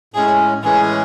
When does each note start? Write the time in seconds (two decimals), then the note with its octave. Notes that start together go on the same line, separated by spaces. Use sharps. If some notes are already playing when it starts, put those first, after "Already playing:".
0.14 A2 G#3 C#4 G#4
0.63 A2 E3 G#3 C#4 G#4